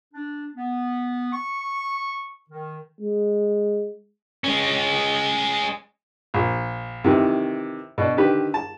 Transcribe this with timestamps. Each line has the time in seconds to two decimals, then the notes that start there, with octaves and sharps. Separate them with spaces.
0.14 D4
0.55 B3
1.33 C#6
2.50 D#3
3.01 G#3
4.44 G#3 C#4
6.34 A#1
7.04 C3 D#3 E3
7.98 B2 D4
8.17 D3 D#3 G4 B4
8.54 A5